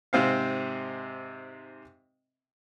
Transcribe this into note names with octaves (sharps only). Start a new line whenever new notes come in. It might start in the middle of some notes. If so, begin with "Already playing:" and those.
G#2 C3 C4 F5